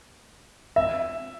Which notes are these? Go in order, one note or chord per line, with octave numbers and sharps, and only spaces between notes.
E5